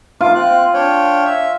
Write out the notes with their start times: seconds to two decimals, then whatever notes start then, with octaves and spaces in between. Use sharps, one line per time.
0.21 F4 D6
0.35 C4 F#6
0.74 D4 C#5 G5
1.25 E5